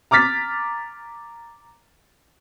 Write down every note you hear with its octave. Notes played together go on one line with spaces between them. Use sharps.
A#5 D6 F6 A6 B6